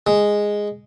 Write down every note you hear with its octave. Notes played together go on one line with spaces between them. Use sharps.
G#3